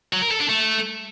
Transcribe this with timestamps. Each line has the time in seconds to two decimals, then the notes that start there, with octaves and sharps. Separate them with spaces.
0.13 F#3
0.22 A#4
0.31 A4
0.40 D4
0.49 A3